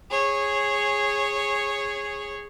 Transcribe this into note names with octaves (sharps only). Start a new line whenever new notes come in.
G#4 C#5